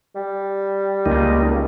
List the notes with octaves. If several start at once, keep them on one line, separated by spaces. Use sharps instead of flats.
G3
C#2 A#3 D#4